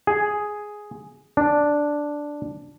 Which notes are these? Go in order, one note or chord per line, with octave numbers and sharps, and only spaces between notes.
G#4
D4